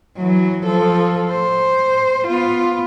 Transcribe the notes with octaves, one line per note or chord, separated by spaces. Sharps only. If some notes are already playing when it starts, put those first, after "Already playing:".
E3 F#3
F3 A4
C5
B3 F4